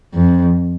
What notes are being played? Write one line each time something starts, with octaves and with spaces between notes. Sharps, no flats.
F2